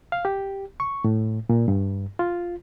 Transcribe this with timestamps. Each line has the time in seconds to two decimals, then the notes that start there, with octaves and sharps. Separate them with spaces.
0.12 F5
0.25 G4
0.80 C#6
1.04 A2
1.49 A#2
1.68 G2
2.19 F4